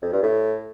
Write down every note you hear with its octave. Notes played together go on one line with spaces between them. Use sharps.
F2
G2
A2